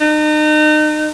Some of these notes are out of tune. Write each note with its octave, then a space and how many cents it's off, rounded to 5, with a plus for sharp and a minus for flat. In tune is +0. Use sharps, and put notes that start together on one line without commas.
D#4 -35